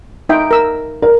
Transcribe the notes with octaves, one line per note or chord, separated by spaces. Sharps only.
D#4 E5 G5
A#4 E6
A#4